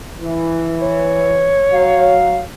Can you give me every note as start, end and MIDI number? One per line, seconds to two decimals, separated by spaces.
0.22 1.61 52
0.82 2.32 73
1.73 2.43 54
1.73 2.43 77